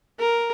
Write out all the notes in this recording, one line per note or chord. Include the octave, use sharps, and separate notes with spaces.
A#4